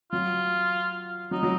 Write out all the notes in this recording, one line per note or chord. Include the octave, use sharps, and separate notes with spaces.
F#3 F4
F#3 D#4
F#3